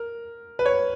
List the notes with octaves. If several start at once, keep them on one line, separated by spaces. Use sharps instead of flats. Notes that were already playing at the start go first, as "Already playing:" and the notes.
Already playing: A#4
B4
C#5